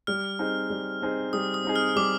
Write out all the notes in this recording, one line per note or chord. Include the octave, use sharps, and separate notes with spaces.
G3 F6
C4 D#4 G#4
G3
C4 D#4 G#4
G3 D#6
D#6
C4 D#4 G#4
F6
G3 D6